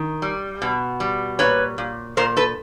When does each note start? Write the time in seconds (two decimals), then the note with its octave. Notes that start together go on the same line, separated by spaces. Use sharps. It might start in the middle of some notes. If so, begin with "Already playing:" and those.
Already playing: D#3
0.22 G3
0.62 B2
1.00 G3
1.39 A#2 B4 C#5
1.78 A#2
2.17 A#2 A#4 C5
2.37 A4 B4